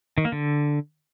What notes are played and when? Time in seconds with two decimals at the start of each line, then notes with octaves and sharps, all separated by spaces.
0.18 D#3
0.25 A#3
0.32 D3